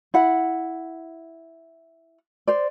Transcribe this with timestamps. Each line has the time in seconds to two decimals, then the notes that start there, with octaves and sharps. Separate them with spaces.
0.14 E4 F#5
2.47 C5 D5